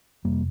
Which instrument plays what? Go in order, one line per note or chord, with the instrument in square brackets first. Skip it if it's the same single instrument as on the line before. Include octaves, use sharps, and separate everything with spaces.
[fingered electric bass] F2 C3 G3 A#3